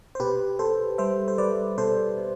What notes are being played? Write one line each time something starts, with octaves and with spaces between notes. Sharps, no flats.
C5
B2 G4 B4
B2 A4 C5
G3 C5 E5
C5
G3 B4 D5
B2 A4 C5
B2